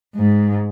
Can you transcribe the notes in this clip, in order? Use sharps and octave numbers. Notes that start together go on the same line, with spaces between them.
G#2